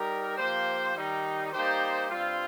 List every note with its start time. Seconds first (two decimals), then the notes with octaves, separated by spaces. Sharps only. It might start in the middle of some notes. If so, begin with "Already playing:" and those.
Already playing: G3 D#4 G4 A#4
0.38 F3 A#3 G4 C5
0.96 D#3 G3 D#4
1.53 G3 A#3 D#4 G4 C5
2.11 G2 G3 C4 F4